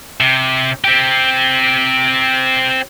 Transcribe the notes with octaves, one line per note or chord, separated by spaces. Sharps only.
C3
C4 G4